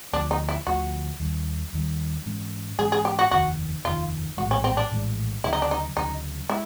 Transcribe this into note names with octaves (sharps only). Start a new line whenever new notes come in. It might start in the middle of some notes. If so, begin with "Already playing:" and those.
D2 D3 F3 A3 D4
D#4
E4
D2 D3 F3 A3 F#4
D#2 D#3 G3
D#2 D#3 G3
G#2 E3 G#3 C#4
G#2 E3 G#3 C#4 G#4
G#4
G4
F#4
F1 D#2 D#3 F#4
F1 D#2 D#3 F4
A#1 A2 E3 G#3 F#4
C#4
C4
D4
A#1 A2 E3 G#3
D2 C#3 F#3 E4
D#4
D4
D#4
D2 C#3 F#3 D#4
G#3 E4